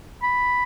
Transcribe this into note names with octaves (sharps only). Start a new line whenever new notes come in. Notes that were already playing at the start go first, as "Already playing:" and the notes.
B5